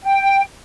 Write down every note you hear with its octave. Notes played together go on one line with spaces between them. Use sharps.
G5